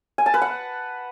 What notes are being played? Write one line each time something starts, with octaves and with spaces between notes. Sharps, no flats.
G#5
A5
B4
F#5